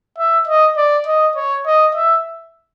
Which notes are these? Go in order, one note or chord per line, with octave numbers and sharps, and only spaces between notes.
E5
D#5
D5
D#5
C#5
D#5
E5